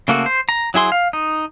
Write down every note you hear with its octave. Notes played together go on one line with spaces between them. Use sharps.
C#3 A3 A#3 F#4 A4
C5
A#5
F#3 E4 G#4 C6
F5
D#4